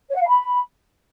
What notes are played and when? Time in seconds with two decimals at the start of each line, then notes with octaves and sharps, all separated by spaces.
0.09 C#5
0.15 F#5
0.21 F5
0.27 B5